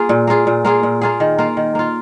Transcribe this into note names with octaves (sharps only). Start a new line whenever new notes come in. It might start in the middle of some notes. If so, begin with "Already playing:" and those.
Already playing: A#3 F4 G#4
A#2
A#3 F4 G#4
A#2
A#3 F4 G#4
A#2
A#3 F4 G#4
D#3
A#3 F4
D#3
A#3 F4